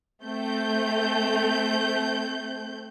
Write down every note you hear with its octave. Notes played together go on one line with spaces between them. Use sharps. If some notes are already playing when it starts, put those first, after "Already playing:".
A3 C4 G6